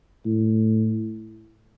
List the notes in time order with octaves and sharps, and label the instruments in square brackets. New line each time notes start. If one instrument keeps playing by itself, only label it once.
[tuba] A2